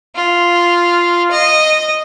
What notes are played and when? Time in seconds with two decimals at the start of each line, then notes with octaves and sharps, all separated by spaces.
0.15 F4
1.31 D#5